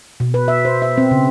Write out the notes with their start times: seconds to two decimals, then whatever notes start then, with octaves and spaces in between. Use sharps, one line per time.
0.20 B2
0.34 B4
0.48 E5
0.65 C5
0.82 E5
0.98 C4
1.11 C#3